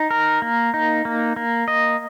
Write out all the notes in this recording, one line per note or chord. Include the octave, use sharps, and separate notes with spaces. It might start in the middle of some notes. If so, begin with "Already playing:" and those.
Already playing: D#4
A#4
A#3
D#4
A#3
A#3
D#5